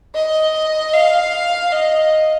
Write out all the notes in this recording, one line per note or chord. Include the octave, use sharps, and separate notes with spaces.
D#5
F5
D#5